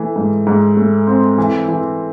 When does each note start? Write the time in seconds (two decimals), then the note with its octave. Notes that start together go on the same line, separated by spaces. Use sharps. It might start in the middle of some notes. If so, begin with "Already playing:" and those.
Already playing: E3 A3
0.16 G#2
0.47 G#2
0.77 A3
1.07 C4
1.38 E3
1.68 E3